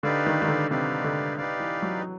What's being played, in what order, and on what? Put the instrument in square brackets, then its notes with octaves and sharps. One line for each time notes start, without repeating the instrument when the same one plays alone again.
[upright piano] D3 [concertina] D#4 G4 B4 D5 F5
[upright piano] D#3
D#3
D3
[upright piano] C3 [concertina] D#4 G4 B4 D5 F5
[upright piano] D3
[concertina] D#4 G4 B4 D5 F5
[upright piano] E3
F#3